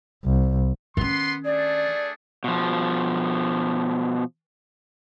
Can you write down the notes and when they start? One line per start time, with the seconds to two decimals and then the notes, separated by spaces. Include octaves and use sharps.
0.25 C2
0.97 D#3 B3 C#4 C6
1.45 A3 D4 G#4 D5
2.44 B2 F3